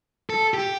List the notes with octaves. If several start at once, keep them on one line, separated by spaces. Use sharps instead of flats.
A4
G4